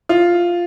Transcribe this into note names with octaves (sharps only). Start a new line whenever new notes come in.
F4